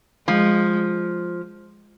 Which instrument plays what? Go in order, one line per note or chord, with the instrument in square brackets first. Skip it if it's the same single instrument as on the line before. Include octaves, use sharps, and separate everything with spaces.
[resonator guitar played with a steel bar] F3 [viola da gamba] G#3